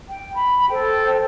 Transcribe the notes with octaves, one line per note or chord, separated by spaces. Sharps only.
G5
B5
A4 C5 G5